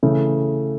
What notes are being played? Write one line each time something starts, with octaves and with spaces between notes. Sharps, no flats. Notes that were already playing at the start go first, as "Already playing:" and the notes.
C#3 E3 A3